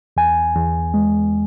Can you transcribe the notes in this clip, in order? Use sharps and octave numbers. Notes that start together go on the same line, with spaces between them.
E2 G#5
E2
G#3